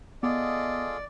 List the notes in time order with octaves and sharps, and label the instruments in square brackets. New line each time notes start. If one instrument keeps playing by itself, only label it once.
[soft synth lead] B3 [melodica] F4 G#4 A4 [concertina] D5 [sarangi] D#5